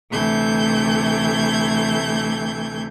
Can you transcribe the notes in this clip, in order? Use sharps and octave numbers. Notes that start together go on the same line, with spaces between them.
D2 C3 E3 A3 G6 G#6